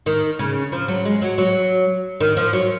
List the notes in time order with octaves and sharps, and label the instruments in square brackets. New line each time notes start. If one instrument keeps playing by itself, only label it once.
[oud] D#3
C#3
F3
F#3
G#3
F#3
F#3
D#3
F3
F#3